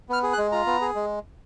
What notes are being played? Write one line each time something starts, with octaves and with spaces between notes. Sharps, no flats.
B3 F6
G#4
F#6
G#3
F4 A#5
B3
G#4
G#3